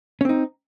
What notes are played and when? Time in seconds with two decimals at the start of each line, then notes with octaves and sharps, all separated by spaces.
0.21 C#4
0.25 C4
0.29 D#4